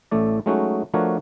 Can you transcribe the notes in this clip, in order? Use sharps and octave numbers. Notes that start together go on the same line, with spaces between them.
A1 A2 A3 D5
F#3 G#3 A3 C#4 D#4 F#4
F3 A3 D4 F#4 A#4 C#5